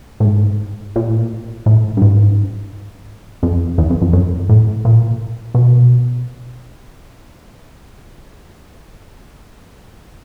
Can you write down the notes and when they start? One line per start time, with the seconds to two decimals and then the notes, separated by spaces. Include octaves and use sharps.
0.20 A2
0.25 G#2
0.96 A#2
1.08 A2
1.19 A#2
1.66 A2
1.97 G2
2.02 G#2
3.43 F2
3.78 E2
3.90 F2
4.02 F2
4.13 F#2
4.49 A2
4.85 A#2
5.54 B2